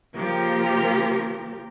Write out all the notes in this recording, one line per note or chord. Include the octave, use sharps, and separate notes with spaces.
C#3 F3 A#3 G4 A#4